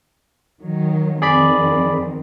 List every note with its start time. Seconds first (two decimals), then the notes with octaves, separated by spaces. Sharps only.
0.61 D#3 F#3
1.22 F2 D#3 C4 G#4 D5 B5